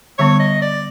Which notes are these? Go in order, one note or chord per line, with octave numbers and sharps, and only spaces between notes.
D3 G3 B3 C#5
D#5
D5